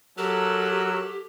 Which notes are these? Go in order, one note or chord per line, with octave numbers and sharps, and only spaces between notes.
F#3 G4 A4 A#4 E6 F#6